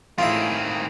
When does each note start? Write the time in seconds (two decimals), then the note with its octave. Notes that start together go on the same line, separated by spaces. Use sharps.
0.18 A2 D#3 C4 E4 F4 G#4 E5